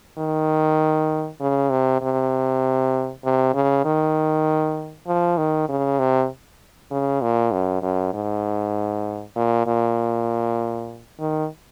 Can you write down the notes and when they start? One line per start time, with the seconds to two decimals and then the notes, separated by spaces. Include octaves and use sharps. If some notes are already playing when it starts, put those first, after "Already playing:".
0.18 D#3
1.40 C#3
1.71 C3
2.01 C3
3.24 C3
3.54 C#3
3.85 D#3
5.07 F3
5.37 D#3
5.69 C#3
5.99 C3
6.91 C#3
7.22 A#2
7.52 F#2
7.82 F#2
8.14 G#2
9.36 A#2
9.67 A#2
11.19 D#3